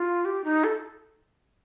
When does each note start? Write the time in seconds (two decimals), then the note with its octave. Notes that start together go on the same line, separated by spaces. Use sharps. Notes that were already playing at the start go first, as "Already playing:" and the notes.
Already playing: F4
0.25 G4
0.44 D#4
0.64 A4